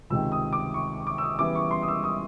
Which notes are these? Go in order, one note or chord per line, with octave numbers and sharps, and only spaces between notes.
C#2 C3 D#3 E6
D#6
D6
C#6
D6
E6
D#6
C#3 E3 G3 B3 D6
C#6
C6
D#6
E6
D#6